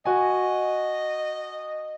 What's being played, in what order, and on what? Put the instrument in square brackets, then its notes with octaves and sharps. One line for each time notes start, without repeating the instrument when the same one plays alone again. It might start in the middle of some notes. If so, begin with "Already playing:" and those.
[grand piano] F#4 G#5 [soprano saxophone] D#5